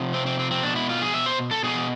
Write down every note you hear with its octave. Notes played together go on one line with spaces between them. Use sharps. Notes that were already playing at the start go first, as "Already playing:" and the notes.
Already playing: C3 F3
C4
C4
C4
C4
B2 D4
E4
F4
G#4
E5
C5
A4
B2 G#4